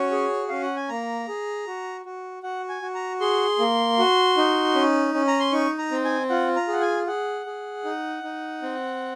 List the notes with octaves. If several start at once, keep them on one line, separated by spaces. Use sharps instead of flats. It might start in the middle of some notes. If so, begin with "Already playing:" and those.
Already playing: C#4 F#4 C#5
G#4
C#4 F5
F#5
G#5
A#3 A#5
G#4
F#4
F#4
F#4 F#5
G#5
F#4
A#5
G#4 C6
A#3
F#4
D#4
C#4
C#4
A#5
C6
D#4 C#6
A#5
C4
G#5
F4 F#5
A#5
G#4 F#5
G#5
G#4 F#5
G#4
D#4
D#4
C4